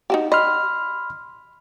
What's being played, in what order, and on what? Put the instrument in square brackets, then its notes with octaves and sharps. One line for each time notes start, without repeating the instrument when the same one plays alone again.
[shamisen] D#4 F#4 G4
[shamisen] D#5 [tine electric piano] B5 C6 F6